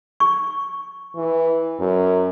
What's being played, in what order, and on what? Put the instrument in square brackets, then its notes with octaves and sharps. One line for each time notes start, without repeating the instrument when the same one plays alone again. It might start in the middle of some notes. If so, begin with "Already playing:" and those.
[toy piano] C#6
[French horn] E3
F#2